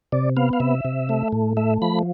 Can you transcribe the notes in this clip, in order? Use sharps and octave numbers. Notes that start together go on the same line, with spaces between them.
C3 D5
B3 F5
F5
C3 E5
C3
A3
A2
A3 E5
F3 B5